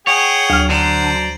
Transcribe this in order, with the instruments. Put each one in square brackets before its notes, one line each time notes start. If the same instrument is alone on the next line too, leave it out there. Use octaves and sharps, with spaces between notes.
[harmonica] G#4 F#5 G5 [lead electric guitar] C#5
[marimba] D2 F6 [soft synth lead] F#3
[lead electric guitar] D3 [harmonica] C5 D5 A#5